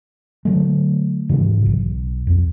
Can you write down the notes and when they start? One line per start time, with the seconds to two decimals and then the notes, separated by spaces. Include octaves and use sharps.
0.45 D3 F#3 A3
1.29 G#2 C#3 E3
1.66 B1
2.27 F2